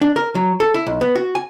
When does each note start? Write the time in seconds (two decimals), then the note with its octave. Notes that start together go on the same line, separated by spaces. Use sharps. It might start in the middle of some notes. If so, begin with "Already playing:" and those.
0.01 D4
0.16 A#4
0.35 F#3
0.60 A4
0.74 E4
0.87 B1
1.01 B3
1.15 F#4
1.35 G#5